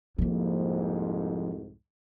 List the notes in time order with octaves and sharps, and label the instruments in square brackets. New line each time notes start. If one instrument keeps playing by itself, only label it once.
[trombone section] C2 F2 G#2 [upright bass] F3 A#3